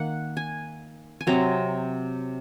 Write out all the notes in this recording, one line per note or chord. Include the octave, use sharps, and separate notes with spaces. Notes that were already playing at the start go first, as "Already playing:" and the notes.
Already playing: D#3 A#3 F#5
G#5
G#5
C3 F#3 C4 A#5